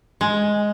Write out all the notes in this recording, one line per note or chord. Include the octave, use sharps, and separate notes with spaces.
G#3